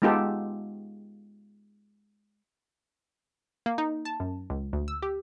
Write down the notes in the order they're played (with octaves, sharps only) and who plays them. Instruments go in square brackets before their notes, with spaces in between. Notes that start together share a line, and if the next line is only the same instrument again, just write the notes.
[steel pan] G#3 B3 D#4 F4 G4 A4
[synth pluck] A#3
D#4
A5
F#2
C#2
D2
E6
G4